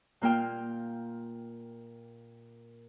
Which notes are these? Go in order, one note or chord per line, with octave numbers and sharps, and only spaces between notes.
A#2 A#3 F4 G5 F6